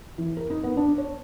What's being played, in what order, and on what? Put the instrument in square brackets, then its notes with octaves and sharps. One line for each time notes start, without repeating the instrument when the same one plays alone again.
[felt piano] E3
A#4
D#4
B3
D4
C#5